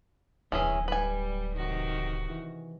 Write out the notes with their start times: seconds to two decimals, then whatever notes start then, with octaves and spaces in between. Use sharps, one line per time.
0.52 D1 E2 E3 C#4 G#4
0.88 G3 B4 G#5
1.54 C3 D#3 F#4
2.30 E3